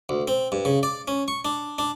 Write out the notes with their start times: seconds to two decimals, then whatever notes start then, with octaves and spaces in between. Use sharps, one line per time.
0.09 D2
0.28 C4
0.52 G2
0.65 C#3
0.83 D5
1.08 C#4
1.28 C#6
1.45 D4
1.78 D4